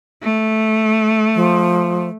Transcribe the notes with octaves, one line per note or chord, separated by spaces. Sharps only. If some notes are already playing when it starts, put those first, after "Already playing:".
A3
F3